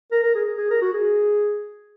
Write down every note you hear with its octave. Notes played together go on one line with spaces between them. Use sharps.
A#4
A#4
G#4
G#4
A#4
F#4
G#4